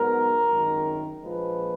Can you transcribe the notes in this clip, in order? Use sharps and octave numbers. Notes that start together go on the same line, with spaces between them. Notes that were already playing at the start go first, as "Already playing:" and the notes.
Already playing: G#2 F#3 B3 A#4
G#1 F#2 D#3
A#1 A#2 F3 G#3 B4